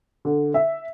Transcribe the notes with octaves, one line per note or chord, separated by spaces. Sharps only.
D3
E5